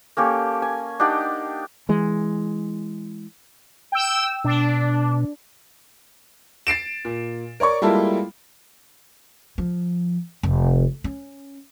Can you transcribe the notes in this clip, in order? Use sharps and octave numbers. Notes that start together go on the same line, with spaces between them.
A#3 C#4 G4 A4
G#5
D4 D#4 G4 F#5
E3 G#3
G5 E6
B2 D4
A6 C7 D7 E7
A#2
A#4 C#5 D5 C#6
G3 G#3 A#3 E4 F4 A4
F3
F1
C#4